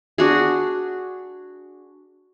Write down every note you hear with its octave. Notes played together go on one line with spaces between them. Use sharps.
D4 F#4 G#4